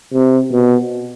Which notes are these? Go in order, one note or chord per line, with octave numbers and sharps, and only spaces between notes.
C3
B2